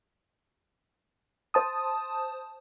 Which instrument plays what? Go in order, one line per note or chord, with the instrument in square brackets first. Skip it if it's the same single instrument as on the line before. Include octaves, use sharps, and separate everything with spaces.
[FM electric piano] C5 A5 D#6